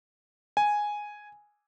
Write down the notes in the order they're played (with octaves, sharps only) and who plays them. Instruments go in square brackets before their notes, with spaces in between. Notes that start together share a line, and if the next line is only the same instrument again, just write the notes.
[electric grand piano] G#5